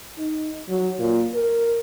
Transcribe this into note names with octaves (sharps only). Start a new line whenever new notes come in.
D#4
F#3
A#2
A#4